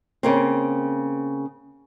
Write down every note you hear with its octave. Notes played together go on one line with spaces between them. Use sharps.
C#3 A#3 C4